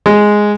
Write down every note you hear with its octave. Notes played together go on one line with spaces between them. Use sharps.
G#3